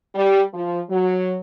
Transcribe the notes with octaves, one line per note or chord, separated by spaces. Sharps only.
G3
F3
F#3